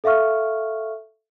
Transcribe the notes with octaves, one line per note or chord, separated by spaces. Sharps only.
A4 E5 F5 C#6 F6